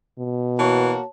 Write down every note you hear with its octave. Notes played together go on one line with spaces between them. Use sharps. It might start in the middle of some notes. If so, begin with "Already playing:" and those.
B2
E3 A#3 F#4 C#5 A5